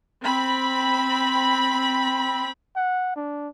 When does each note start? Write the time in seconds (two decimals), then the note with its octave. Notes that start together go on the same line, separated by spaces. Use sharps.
0.23 C4 B5
2.76 F#5
3.16 D4